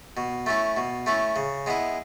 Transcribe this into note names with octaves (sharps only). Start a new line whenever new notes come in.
B2
A3 C#4 E4
B2
A3 C#4 E4
C#3
G#3 B3 E4